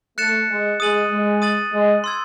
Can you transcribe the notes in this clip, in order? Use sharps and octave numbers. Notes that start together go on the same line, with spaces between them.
A3 F#6 A6 C#7 E7
G#3
G#3 D#6 A6 D#7 F#7
G#3
D#6 A6 D#7 F#7
G#3
C6 E6 G#6